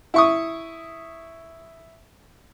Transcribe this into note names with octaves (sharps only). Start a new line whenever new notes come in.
E4 C#6 D#6